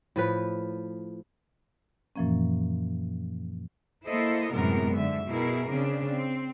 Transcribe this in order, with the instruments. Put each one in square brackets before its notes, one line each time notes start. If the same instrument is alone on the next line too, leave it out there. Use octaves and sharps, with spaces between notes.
[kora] A2 F3 B4
[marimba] F#2 A#2 E3 F3 A#3 C#4
[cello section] A#3 E4 A4 C5 D#5
F#2 A2 C3 G#3 B3 A#4
G#2 D3 E5
B2 E4 G#4 A#4
C#3 C4 D4
C4